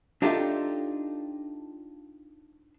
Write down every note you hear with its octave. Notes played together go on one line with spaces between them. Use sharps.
D4 D#4 F4 G4 A4 E5